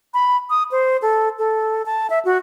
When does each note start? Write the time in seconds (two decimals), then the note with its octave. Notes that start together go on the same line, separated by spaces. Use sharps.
0.14 B5
0.50 D#6
0.71 C5
1.02 A4
1.39 A4
1.86 A5
2.10 E5
2.25 F#4